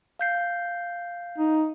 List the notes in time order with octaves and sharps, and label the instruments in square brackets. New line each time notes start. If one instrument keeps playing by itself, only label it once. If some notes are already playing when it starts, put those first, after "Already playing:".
[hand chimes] F5 G6 C7
[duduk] D#4